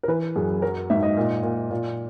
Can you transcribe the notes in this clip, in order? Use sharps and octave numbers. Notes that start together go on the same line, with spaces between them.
A#4
E3 B4
F#2 G#4
F#3 A#4
G#2 E5
D#5
A#2
A#2
A#2